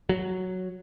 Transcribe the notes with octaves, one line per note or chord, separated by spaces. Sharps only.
F#3